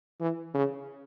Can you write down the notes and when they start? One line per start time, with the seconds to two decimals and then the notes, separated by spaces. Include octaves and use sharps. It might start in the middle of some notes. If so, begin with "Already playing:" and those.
0.20 E3
0.54 C#3